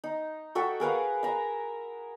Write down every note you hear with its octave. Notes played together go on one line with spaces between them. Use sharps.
D#4
F#4 A4 E5 G5
G#4 A#4 B4 F5
E5 A#5